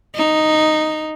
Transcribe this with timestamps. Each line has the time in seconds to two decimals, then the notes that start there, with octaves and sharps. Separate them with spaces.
0.15 D#4